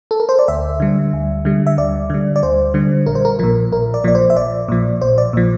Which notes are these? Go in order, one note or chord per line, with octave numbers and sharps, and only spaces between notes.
A4
A#4
C5
D5
D2 E5
D3 G3
D2
D3 G3
E5
D2 D5
D3 G3
D5
D2 C5
D3 G3
A#1 A#4
C5
A#4
A#2 F3 A#4
A#1 A#4
D5
A#2 F3 D5
C5
E5
A#1 D5
A#2 F3
A#1 C5
D5
A#2 F3